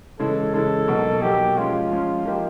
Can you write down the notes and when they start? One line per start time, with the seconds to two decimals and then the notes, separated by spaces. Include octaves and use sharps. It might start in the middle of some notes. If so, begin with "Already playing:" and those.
0.19 C#3 E3 G#3 A4
0.54 C#3 E3 G#3 A4
0.88 B2 F#3 A#3 D#4
1.22 B2 F#3 A#3 D#4 G4
1.57 F3 G#3 C#4 F4
1.91 F3 G#3 C#4
2.25 F3 A#3 D#4 G4